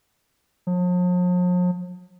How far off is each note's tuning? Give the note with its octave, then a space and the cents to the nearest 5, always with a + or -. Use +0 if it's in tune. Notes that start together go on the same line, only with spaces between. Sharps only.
F3 +45